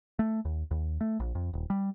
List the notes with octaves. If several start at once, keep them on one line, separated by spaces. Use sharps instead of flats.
A3
D#2
D#2
A3
A#1
F2
D#1
G3